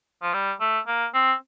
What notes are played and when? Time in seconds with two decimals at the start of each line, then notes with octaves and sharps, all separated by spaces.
0.23 F3
0.34 G3
0.60 A3
0.87 A#3
1.14 C4